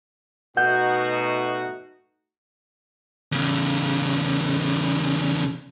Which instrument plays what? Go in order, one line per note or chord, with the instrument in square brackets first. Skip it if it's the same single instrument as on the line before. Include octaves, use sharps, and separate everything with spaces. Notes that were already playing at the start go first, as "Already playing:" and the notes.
[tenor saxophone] B2 [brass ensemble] A3 D#4 F#4 [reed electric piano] F#5 G6
[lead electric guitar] E2 C#3